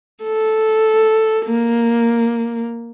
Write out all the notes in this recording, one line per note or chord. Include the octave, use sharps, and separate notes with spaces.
A4
A#3